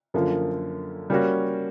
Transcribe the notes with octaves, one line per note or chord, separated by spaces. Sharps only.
F#2 D3 F3 A#3
G3 A#3 C#4 F#4